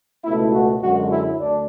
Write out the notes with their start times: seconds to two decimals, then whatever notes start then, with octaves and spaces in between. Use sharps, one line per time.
0.24 C#2 B2 A3 E4
0.53 F#4
0.81 F#2 D3 G#3 F#4
1.09 E4
1.38 D2 D4